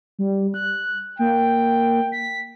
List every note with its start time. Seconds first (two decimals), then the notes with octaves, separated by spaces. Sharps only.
0.19 G3
0.54 F#6
1.19 A#3 G5
2.12 B6